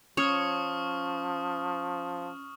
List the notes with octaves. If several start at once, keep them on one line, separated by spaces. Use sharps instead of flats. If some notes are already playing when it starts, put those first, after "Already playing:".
F3 C#4 C#5 C#6 D#6 F6